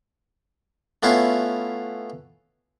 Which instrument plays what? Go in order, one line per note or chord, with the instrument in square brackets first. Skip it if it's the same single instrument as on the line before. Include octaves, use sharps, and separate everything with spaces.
[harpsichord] A3 B3 C#4 E4 F4 F5